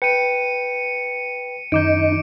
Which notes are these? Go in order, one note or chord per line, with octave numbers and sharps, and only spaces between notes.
B4 G5 C#7 D#7
F#2 D#3 D#4 D6 G6 D7